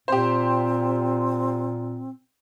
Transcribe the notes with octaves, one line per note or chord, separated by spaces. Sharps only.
A#2 C4 G4 C5